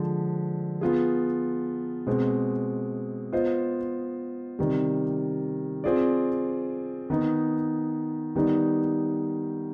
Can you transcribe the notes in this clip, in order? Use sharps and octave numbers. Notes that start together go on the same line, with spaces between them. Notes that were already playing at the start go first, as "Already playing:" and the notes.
Already playing: D3 F3 G#3
B3 F4 G#4
B2 G#3 C4
B3 F4 C5 D#5
C3 D#3 G3
C4 F4 G#4 D5
D#3 B3 D#4
D#3 G3 B3 D#4